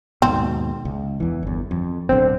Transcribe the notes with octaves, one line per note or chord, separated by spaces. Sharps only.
D#2 G#2 B2 C4
C#2
E2 E3
G1 E2
F2
D1 B1 D3 C4